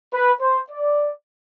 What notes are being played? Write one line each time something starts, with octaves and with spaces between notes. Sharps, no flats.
B4
C5
D5